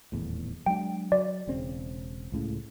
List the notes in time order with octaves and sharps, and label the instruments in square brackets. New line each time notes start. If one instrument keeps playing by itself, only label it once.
[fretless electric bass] D#1 E2 A2
[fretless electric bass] F#3 G#3 D4 [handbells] G5
[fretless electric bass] F#3 [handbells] D5
[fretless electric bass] E1 C#3 C4
C#2 A2 C#3